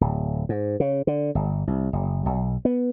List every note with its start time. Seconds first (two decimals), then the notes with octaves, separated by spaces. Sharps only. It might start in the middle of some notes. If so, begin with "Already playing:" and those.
0.01 D1
0.49 G#2
0.80 C#3
1.07 D3
1.35 G1
1.67 C2
1.93 F#1
2.26 B1
2.65 B3